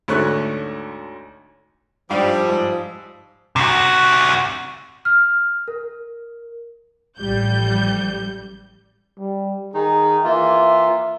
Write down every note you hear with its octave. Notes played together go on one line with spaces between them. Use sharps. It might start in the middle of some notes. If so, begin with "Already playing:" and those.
D2 G#2 A3 C#4 C#6 F#6
G#2 F3 G3 D4 F5 D#6 E6
G#2
C3 F#4
F6
A#4
A1 F3 G3 G6
G3
D#3 D#4 G#4
E3 A#3 F4 E5